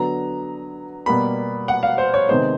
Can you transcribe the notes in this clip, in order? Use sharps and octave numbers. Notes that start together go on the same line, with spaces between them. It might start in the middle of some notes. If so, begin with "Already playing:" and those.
Already playing: D3 F#3 B3 A#5
B2 G3 A#3 B5
F#5
F5
C5
C#5
C3 D#3 G#3 B3 C5